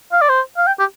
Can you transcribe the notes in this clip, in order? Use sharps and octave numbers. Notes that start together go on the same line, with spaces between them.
F5
D5
C5
F5
G5
G4